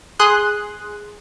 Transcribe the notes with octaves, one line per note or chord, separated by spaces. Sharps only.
G#4 C6 D#6 F#6